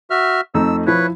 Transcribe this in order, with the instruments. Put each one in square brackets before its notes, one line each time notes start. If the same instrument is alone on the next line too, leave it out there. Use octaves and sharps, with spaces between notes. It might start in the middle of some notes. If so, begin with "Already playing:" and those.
[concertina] F#4 E5 F6
[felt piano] F2 A3 D#4 [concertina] E6
[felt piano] F3 E4 [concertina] B4 C#5